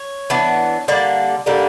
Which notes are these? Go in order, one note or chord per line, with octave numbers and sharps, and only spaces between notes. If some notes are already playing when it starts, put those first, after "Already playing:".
Already playing: C#5
E3 B3 D4
D3 G3 A#3 D5
D3 G3 A#3